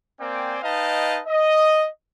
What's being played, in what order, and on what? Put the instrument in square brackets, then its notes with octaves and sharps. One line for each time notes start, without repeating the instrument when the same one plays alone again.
[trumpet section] A#3 C4 C5 D5 G5 G#5
D#4 B4 D#5 F5 G5 A5
D#5